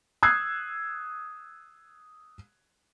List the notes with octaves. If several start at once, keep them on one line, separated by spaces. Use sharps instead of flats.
D#6 E6 F#6 G#6 C7